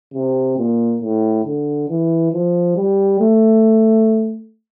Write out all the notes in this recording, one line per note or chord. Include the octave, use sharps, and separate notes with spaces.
C3
A#2
A2
D3
E3
F3
G3
A3